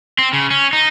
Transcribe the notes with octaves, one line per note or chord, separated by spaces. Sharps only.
C4
C#3
C#4
D#4